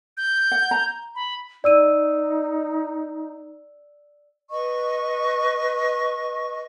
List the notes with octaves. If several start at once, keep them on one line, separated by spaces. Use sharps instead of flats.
G6
F#5
A#5
B5
D#4 D5 E6 D#7
B4 D#5 C#6